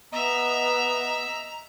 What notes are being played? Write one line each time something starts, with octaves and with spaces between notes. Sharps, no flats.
B3 D#5 E5 A#5